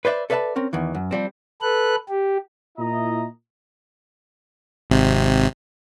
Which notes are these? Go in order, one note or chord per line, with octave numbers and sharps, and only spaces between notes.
B4 C5 D5 E5
A4 B4 D5 E5 F5 A5
C4 C#4 A#4
E2 D#3 E3
F#2
F3 G3 C4
A4 B4 F#6
G4
A#2 E4 D#5 A#5
G#1 C3